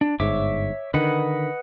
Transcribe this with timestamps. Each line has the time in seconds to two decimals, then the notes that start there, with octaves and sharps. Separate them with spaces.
0.01 D4
0.20 G1 G#2 C#5 E5 D6
0.94 D3 D#3 B4 D#5 F#5